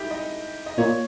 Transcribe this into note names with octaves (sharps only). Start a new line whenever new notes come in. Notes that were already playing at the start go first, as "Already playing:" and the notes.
Already playing: D#4 E4 G4
D#5
D#5
A#2 C#5